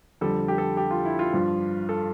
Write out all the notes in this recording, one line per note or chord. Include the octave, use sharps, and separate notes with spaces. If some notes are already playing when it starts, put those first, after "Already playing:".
F2 D3 G3 A4
G4
A4
G4
F4
E4
F4
G2 F3
A4